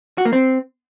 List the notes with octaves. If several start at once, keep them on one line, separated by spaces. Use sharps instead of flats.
F#4
A#3
C4